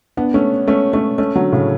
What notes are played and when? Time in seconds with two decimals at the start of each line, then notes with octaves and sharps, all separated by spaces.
0.17 B3 D4
0.34 A3 C#4
0.68 A3 C#4
0.93 A3 C#4
1.18 A3 C#4
1.35 D3 F#3
1.52 A2 C#3